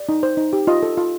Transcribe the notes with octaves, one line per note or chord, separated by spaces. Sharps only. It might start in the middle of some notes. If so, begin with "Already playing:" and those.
Already playing: D5
D#4
C5
D#4
G4
F4 D#5
A4
F4